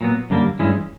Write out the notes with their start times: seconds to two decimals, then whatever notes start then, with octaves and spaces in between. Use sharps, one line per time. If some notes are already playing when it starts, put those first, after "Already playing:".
0.01 A#2 F#3 B3
0.30 F#2 D3 G3 A#3
0.59 G2 E3 G#3 C#4 E4